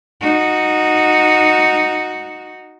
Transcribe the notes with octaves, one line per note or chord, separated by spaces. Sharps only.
D#4 F#4